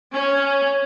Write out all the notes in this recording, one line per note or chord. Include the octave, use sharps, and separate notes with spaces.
C#4